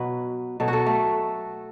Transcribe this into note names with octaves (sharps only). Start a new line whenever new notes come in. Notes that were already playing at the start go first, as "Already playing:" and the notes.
Already playing: B2 F#3 B4
B2 F#3 A4
F#4
A4
A3